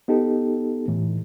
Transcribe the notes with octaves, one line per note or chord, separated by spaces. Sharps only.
B3 D#4 G4 A4
A2 E3